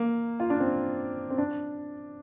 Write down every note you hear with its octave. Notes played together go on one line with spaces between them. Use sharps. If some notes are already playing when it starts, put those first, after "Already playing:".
Already playing: A#3
F4
D4
C4
C4
D4